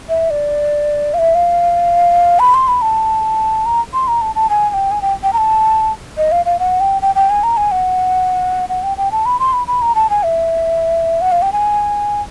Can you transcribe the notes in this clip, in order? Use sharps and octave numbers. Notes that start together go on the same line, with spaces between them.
E5
D5
F5
E5
F5
B5
C6
B5
A5
A#5
C6
A#5
A5
A5
G#5
G#5
G5
G#5
G5
G5
A#5
A5
D#5
F5
F5
F#5
G5
G5
G5
G#5
A#5
G#5
F#5
F#5
G5
G5
A5
B5
C6
B5
B5
A#5
A5
G#5
E5
F#5
F5
G5
G#5